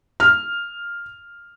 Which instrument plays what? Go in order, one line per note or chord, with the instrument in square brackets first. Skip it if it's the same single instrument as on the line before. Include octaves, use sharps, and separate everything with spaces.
[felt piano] F6